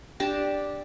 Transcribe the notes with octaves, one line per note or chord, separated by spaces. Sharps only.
D4 G4 D5 A5